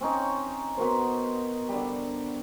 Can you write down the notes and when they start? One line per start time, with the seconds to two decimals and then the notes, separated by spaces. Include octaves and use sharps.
0.01 C4 C#4 D#4 C#5
0.77 B3 F#4 A#4 C5
1.69 D3 G3